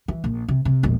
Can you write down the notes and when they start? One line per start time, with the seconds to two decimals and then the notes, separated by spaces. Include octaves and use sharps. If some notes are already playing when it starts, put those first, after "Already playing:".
0.08 E3
0.24 A#1
0.49 C3
0.65 C3
0.83 E1 A#1